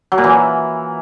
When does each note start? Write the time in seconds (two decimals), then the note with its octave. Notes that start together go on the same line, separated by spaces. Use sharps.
0.12 F#3
0.18 A#2
0.24 E3